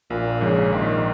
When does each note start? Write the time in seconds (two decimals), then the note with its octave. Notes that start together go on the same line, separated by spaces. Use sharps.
0.10 A#1 A#2
0.41 G#2 C#3 F3
0.72 A#1 D#3